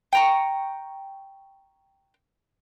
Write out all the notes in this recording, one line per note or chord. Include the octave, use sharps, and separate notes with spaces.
G5 A#5 C#6